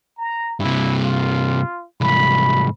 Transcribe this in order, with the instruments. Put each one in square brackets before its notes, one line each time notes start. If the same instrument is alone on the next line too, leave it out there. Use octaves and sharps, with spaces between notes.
[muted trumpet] A#5
[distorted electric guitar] G2 C3 [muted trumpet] E4
[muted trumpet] F4
[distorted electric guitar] C2 G#2 [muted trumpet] B5